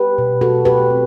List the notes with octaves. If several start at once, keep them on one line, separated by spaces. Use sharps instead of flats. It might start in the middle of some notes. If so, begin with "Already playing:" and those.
Already playing: G4 B4
B2
A3 F#4 A4
B2 G4 B4
C4